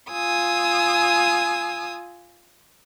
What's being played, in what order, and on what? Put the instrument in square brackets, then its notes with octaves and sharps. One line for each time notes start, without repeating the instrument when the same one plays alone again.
[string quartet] F4 G#5 D#6 E6